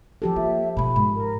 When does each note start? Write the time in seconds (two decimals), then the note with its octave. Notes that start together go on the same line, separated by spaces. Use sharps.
0.22 F3 G4 A4
0.36 A#3 E5
0.77 B2 B3 B5
0.96 G#2
1.15 A#4